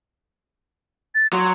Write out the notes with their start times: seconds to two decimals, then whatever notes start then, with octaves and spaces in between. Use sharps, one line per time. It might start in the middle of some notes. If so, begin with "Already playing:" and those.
1.15 A6
1.33 F#3 C6